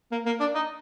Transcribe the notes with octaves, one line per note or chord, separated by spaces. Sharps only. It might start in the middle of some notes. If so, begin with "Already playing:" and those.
A#3
A#3
D4
D#4